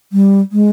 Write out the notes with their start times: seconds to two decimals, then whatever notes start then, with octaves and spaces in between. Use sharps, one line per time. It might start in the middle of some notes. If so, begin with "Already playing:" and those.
0.13 G3
0.52 G#3